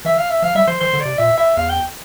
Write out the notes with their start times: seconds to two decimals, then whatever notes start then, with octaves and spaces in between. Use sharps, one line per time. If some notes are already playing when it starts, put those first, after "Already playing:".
0.05 E3 E5
0.18 F5
0.30 E5
0.42 F3 F5
0.55 G3 E5
0.68 F3 C5
0.80 E3 C5
0.93 D3
1.00 D5
1.05 C3
1.18 A#2 E5
1.37 E5
1.57 E2 F5
1.69 G5